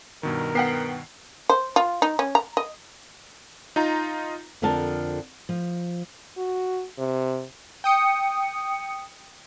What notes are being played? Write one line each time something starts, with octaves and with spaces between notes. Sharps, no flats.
G2 B2 D#3 A#4
B3 F#5 G5 C7
C5
F4
D#4
C#4
A#5
D#5
D#4 F4 A#5
F2 D3 F3 A#4 A5
F3
F#4
C3
G5 D#6 C#7